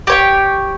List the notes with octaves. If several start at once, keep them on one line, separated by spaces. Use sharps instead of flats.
G4 C#5 G5